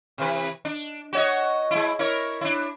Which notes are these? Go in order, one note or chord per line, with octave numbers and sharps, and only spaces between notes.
C3 E3 B4
D4
F#4 C#5 D#5
G#3 E4
E4 A#4 C#5
D4 E4